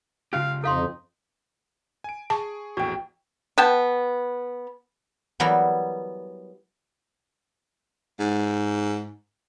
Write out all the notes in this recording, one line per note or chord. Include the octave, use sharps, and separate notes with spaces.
C#3 C#4 F4 G4 F5
F2 D#4 A4 F5 C6
G#5 D7
G#4 A5 C#6
A#1 E2 A2 F#4 G5
B3 G5 A5
E3 F#3 G3 B3 E4 A#4
G#2